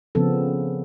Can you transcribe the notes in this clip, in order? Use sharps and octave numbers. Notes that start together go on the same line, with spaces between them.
C#3 F3 B3 C4 A4